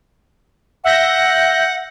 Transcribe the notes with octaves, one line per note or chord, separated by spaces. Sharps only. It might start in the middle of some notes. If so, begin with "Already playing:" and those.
E5 F#5 G6 A#6